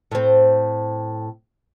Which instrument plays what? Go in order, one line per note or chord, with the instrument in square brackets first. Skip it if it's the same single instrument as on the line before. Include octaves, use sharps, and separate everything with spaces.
[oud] A2 C4